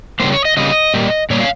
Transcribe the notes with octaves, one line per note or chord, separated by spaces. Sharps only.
C#3 G3 A#3 C5
C#5
D#5
C#3 G3 A#3 D#5
A#2 G3 A#3
A#2 G3 A#3 C#5
F5